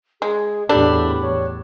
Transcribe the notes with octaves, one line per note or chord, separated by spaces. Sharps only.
G#3 G#4
E2 A2 D4 G4 A4 B5
C#5